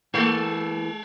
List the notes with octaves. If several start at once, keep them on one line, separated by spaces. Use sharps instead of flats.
E3 G#3 A#3 A4